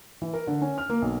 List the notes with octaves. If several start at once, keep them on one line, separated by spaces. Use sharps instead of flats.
E3
A#4
D3
C#4
F6
A#3
B1